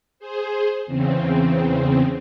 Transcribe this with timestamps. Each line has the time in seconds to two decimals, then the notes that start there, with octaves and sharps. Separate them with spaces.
0.19 G#4 C5
0.86 E2 C#3 C4